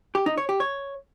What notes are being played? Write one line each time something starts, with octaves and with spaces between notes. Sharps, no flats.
G4
D#4
C#5
G4
C#5